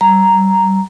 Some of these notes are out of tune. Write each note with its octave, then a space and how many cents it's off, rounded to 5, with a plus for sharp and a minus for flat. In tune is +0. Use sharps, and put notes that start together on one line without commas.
G3 -30 A#5 +0